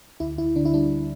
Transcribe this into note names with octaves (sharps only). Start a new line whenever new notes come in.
D2 E4
D2 E4
D3 D4
E4
G3 D4